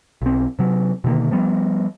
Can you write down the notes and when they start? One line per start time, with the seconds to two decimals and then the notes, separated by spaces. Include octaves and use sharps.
0.22 B1 C4
0.59 C3 F#3
1.04 B2 D3 D#3 A#3
1.31 F3 G3 B3